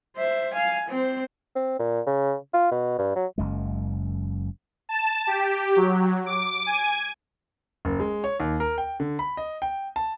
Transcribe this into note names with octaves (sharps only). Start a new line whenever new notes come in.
C5 E5
F5 G#5
C4 C5
C4
A#2
C#3
F4
B2
G2
F#3
F#1 F#2 G#3
A5
G4
F#3
D6
G#5
F#1
G#3
C#5
D#2
A#4
G5
D3
B5
D#5
G5
A5